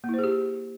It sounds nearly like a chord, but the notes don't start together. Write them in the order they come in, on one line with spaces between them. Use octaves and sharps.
A#3 E4 C5 G#4 G4